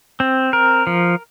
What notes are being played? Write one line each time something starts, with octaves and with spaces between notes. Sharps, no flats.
C4
A#4
F3